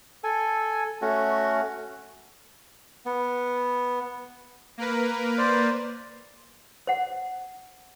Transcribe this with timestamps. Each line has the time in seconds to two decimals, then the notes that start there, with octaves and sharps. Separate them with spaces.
0.24 A4 G#5
1.02 A3 C#4 F#4
3.06 B3
4.78 A#3 A#4 B4
5.38 C5 D5
6.87 C5 F#5